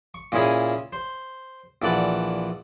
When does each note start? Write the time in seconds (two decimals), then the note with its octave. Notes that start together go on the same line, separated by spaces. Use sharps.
0.14 C#6
0.32 A#2 C#4 E4 G#4 G#5
0.93 C5
1.82 A#1 E3 A4 D5 F#5 D6